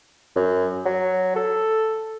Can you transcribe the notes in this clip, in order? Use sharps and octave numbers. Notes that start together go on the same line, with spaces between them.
F#2
F#3
A4